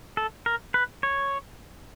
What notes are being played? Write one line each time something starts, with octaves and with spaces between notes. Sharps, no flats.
A4
A#4
B4
C#5